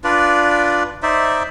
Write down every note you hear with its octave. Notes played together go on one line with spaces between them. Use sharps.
D4 F4 B4 D5
D#4 C5 D5 E5